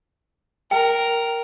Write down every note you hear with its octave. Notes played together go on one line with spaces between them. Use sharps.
A#4 G5